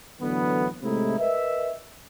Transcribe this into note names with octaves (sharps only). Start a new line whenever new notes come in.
A2 D3 E3 F#3 B3
A2 C3 G#3 A3 D#4 E4
A#4 B4 D#5 E5